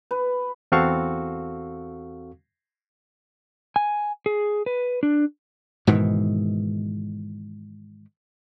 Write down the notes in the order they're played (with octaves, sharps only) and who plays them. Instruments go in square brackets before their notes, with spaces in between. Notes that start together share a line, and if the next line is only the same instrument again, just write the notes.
[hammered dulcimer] B4
[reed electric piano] E2 C4 F#4 A4 F5 C#6
[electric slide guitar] G#5
G#4
B4
D4
[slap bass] G#2 B2 D#3 E3